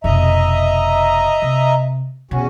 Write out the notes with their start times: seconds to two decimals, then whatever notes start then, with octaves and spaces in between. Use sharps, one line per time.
0.04 F1 B2 D#5 E5 A#5
1.42 C3
2.31 E2 B2 C#4 F#4